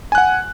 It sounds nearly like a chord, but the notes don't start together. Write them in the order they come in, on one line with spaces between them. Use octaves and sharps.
G#5 F#6 F#5